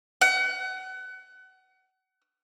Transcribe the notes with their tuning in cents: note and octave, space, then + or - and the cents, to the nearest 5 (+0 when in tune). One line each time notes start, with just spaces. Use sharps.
F#5 +30